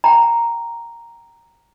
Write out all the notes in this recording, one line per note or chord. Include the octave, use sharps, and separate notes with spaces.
G5 A#5